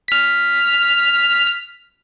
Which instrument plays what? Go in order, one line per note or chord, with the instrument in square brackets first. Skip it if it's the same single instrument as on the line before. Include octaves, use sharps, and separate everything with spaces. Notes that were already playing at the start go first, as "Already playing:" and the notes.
[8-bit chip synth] F6 B6